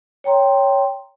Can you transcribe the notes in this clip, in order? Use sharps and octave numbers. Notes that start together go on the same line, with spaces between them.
C#5 G5 A#5 C6